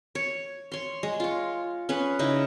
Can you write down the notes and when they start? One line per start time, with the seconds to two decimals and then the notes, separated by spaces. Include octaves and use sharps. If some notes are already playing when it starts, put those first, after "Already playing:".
0.15 C#5
0.72 C#5 C6
1.03 G#3
1.20 F4 C#5
1.89 C#4 G#4 B4
2.19 C#3 D#4 E4